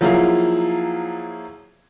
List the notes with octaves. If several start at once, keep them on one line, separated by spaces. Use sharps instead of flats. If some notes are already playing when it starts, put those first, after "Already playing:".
F3 F#3 A#3 E4 G#4 F5